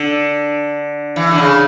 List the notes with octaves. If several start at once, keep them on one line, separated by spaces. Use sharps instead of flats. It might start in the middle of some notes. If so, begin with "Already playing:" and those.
Already playing: D3
E3
D3
C#3